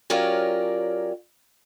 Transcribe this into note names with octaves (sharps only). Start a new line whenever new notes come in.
F#3 C#4 F4 G4 A#4 D5